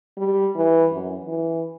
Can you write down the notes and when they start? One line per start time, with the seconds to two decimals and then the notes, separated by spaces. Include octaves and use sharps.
0.18 G3
0.55 E3
0.91 F#2
1.26 E3